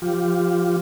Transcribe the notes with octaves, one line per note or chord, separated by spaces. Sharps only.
F3 F4 G4